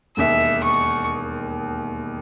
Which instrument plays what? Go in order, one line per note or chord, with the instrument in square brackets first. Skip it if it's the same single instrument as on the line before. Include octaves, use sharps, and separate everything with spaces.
[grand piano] E1 D#2 D#3 [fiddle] E5
[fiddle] C#6